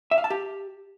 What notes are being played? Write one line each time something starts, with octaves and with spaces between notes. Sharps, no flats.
E5
F5
A5
G4